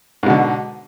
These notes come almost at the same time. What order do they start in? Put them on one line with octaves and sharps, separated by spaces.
G#2 B2 D3